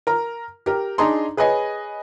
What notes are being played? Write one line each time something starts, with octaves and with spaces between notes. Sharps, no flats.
A#4 A#5
G4 A#4
D4 D#4 G#4 A#5 C6
G#4 B4 C#5 D#5 G#5